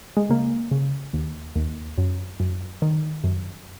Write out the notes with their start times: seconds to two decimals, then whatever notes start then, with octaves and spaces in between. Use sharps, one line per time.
0.17 G#3
0.29 C#3 A#3
0.71 C#3
1.13 D#2
1.56 D#2
1.98 F#2
2.40 F#2
2.82 D#3
3.24 F#2